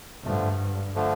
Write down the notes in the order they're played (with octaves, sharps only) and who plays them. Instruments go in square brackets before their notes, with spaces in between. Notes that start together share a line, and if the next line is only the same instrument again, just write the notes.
[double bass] G2 [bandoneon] D3 F3 A3
[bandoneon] D3 F3 A3